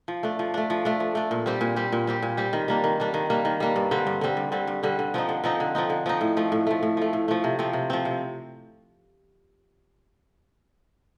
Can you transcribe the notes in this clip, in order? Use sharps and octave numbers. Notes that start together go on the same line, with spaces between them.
F3
A3 D4
F3
A3 D4
F3
A3 D4
F3
A3 D4
A#2
G3 C4 G4
A#2
G3 C4 G4
A#2
G3 C4 G4
A#2
G3 C4 G4
D#3
G3 A#3 D4
D#3
G3 A#3 D4
D#3
G3 A#3 D4
D#3
G3 A#3 D4
G2
D3 G3 C4
G2
D3 G3 C4
G2
D3 G3 C4
G2
D3 G3 C4
D3
F3 C4 D#4
D3
F3 C4 D#4
D3
F3 C4 D#4
D3
F3 C4 D#4
A2
F3 A3
A2
F3 A3
A2
F3 A3
A2
F3 A3
C3
F3 C4
C3
F3 C4
C3